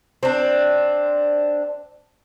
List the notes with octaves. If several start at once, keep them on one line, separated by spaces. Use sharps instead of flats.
C4 D4